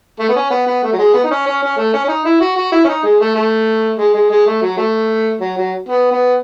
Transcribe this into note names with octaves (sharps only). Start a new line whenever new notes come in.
A3
B3
C#4
B3
B3
A3
F#3
G#3
B3
D#4
C#4
C#4
C#4
A3
C#4
C#4
D#4
E4
F#4
F#4
E4
C#4
D#4
G#3
A3
A3
G#3
G#3
G#3
A3
F#3
A3
F#3
F#3
B3
B3